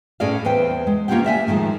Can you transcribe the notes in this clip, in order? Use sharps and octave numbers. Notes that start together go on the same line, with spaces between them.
A2 C#4 G#4 D5 D#5 F5
E2 B4 C5 G5
G#3
A#3 C#4 F4 G4 F#5 G5
D5 E5 F#5 G#5
A2 D#3 F3 G#3